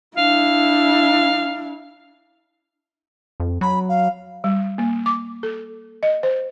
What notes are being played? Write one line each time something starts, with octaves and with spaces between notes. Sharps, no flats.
D4 E4 F5
F2
F#3 B5
F5
G3
A#3
D6
A4
D#5
C5